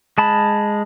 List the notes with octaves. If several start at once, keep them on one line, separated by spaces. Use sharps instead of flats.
G#3 A5 B5